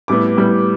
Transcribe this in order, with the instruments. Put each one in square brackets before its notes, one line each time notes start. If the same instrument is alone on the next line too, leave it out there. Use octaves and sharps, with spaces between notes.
[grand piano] A2 G3 B3 D6
A2 G3 B3